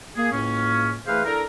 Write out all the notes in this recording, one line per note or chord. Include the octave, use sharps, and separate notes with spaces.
A#3 G#4
C#2 A2 A#3 C#4
E3 A3 G#4 B4 C5 F5
D4 E4 A4 A#4